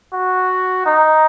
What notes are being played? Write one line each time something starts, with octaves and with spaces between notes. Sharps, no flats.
F#4
D#4